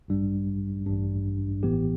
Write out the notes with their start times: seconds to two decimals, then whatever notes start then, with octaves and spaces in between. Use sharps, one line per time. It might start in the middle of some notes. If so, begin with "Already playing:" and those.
0.08 A1 G2 G3 D4
0.86 A1 G2 G3 D4
1.63 A1 A2 E3 B3 G4